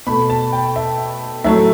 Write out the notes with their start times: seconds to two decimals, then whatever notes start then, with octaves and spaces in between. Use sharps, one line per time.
0.07 B2 A3 B5
0.30 A5
0.52 G5
0.76 E5
1.44 A2 F#3 A3 E5